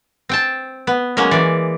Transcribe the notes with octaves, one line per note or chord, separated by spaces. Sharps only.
C4 G5 A5
B3
F#3 G#3 A#3 C#4
E3 D5